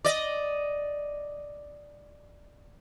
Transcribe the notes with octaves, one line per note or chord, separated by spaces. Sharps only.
D5 D#5